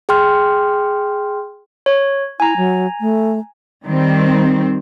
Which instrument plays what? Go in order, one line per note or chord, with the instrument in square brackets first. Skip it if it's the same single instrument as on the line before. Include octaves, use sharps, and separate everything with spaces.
[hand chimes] G#4 G5 C6 F6
[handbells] C#5
[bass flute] E4 [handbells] G#5 A#5
[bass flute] F#3
A3
[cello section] D#3 G3 C4